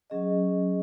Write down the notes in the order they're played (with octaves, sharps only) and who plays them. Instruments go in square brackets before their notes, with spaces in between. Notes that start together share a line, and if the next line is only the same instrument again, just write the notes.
[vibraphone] F#3 C#4 G#4 D#5